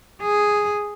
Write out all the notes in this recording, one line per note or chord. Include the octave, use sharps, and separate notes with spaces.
G#4